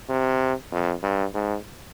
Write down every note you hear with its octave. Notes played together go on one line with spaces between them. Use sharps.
C3
F2
G2
G#2